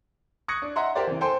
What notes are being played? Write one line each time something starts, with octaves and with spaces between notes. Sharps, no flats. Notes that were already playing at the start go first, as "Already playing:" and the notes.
C#6 D#6 F#6 G#6 A#6 C#7
D4
D#5 E5 F#5 A#5 C6
G4 A#4 C5 D5
C3 E3
A4 C5 G5 G#5 C6